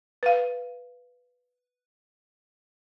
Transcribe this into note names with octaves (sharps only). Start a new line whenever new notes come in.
B4 F5